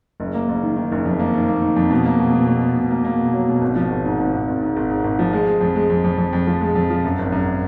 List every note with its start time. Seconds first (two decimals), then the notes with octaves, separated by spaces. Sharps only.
0.20 F#1
0.34 A#3
0.48 F#1
0.62 D#3
0.76 D#3
0.92 F#1
1.05 F2
1.19 A#3
1.34 D#3
1.48 A#3
1.62 D#3
1.76 F2
1.91 B2
2.06 A#3
2.20 B2
2.33 B2
2.47 B2
2.62 B2
2.77 B2
2.91 A#3
3.05 A#3
3.19 B2
3.33 F#3
3.48 B2
3.62 G#1
3.76 F3
3.90 G#1
4.05 G#2
4.19 G#1
4.33 G#1
4.48 G#1
4.61 G#2
4.76 G#1
4.90 G#2
5.04 G#1
5.19 F3
5.33 G#3
5.47 G#3
5.61 F2
5.76 G#3
5.90 F2
6.04 F2
6.18 F2
6.33 F2
6.47 F3
6.61 G#3
6.75 F2
6.90 F3
7.04 F#2
7.19 G#1
7.32 F#2